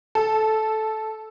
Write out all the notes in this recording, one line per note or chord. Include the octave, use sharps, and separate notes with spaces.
A4